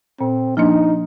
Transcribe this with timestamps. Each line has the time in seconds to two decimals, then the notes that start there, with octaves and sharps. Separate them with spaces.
0.20 A#2 C4
0.57 F3 A#3 D4 D#4